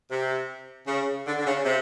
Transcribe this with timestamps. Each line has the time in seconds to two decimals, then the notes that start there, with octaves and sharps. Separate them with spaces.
0.10 C3
0.87 C#3
1.27 D3
1.39 D3
1.46 C#3
1.65 C3